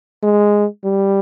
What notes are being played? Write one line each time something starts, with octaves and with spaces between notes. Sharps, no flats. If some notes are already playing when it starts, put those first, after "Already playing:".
G#3
G3